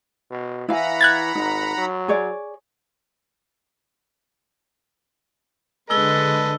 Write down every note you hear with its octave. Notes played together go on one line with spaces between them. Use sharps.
B2
E3 E4 F5 F#5 G#5 A#5 B5
F#6 G#6 A6
G#1 D#4
F#3
G#4 C#5 D5
D3 G#3 A4 B4 D#5 E6 G7